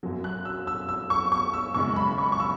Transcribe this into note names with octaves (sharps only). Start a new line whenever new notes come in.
F#2 F#3
F#6
E6
E6
E6
C#6
C#6
E6
F#2 C#3 G#3 C#6
B5
C#6
C#6
E6